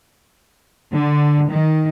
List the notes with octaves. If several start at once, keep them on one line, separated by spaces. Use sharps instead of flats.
D3
D#3